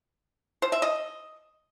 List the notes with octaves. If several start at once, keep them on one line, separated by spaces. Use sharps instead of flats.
C5
E5
D#5